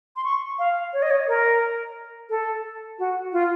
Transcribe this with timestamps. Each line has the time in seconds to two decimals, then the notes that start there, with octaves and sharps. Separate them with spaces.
0.16 C6
0.24 C#6
0.59 F5
0.93 C#5
1.02 D#5
1.11 C#5
1.28 A#4
2.30 A4
2.99 F#4
3.33 F4